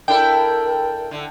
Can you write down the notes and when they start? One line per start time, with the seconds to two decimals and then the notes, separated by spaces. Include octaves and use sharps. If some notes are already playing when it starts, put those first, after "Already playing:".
0.08 D4 E4 A4 A#4 G5
1.11 D3